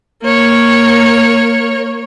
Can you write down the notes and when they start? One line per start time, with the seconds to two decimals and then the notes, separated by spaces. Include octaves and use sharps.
0.23 A#3 C#5